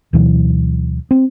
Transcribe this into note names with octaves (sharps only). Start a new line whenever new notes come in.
D2 B2 E3 F#3
C4